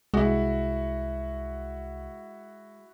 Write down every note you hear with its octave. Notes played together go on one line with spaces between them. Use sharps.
C2 G#3 E4 F#4